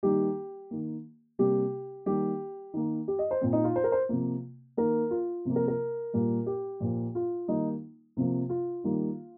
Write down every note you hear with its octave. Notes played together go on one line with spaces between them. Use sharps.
D#3 G3 A#3 G4
D#3 A#3
C3 G3 A#3 G4
D#3 G3 A#3 G4
D#3 A#3
G4
D#5
C5
A#2 A#3 C4
D#4
F4
C5
A#4
C5
C3 F3 A#3
D#3 A#3 A#4
F4
C3 F3 A#3
A#4
A#4
A#2 G3 A#3
G4
A#2 F3 A#3
F4
D#3 G3 A#3 D#4
C3 F3 A#3
F4
D#3 G3 A#3